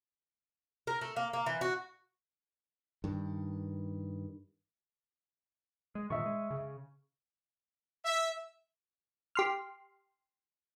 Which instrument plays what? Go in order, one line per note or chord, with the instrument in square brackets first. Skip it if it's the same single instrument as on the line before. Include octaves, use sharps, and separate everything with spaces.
[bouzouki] A#4
A3
A#3
A#3
E3
F#4
[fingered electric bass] G2 D#3
[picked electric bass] G#3
[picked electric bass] G2 A#2 D#3 [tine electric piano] D#5 E5 C#6
[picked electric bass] G#3
C#3
[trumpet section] E5
[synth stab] G4 C6 F6